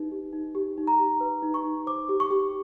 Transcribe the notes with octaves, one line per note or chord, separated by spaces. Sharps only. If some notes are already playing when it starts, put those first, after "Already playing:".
Already playing: D#4 G4 B4
G4
D#4
G4
D#4
A#5
G4
B4
D#4
C#6
D#4
C5 D6
G4
C#6
G4